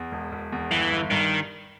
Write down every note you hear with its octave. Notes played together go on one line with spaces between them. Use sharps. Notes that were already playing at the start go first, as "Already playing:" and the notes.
Already playing: E2
E1
E1
E2
G1 E3
G1
G2 D#3